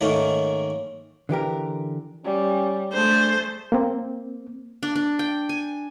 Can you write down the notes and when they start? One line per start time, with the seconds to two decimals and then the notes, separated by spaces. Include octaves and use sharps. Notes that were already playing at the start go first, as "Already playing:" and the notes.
0.01 G#2 D#3 A3 A#3 C#4
1.29 D3 E3 G4 A#4
2.25 G3 C#4
2.93 A3 D4 G#4 C5
3.72 A#3 C4
4.83 D4
4.96 D4
5.19 G5
5.49 G#5